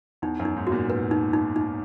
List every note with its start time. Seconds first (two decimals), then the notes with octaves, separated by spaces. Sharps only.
0.22 E2 D#4
0.39 F#2
0.45 D#4
0.56 G#2
0.67 F#4
0.72 A#2
0.89 G#2 B4
1.11 D#4
1.33 D#4
1.56 D#4